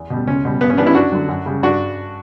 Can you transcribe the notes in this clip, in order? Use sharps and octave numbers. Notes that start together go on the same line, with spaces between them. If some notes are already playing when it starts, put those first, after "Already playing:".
Already playing: E2
B2 G3
C#2 C#4
B2 G3
G2 B3
C#4
E3 G3 B3 D4
C#4 E4
F#2 D4 F#4
D3 F#3
F#2
C#3 G3
G2 D4 F#4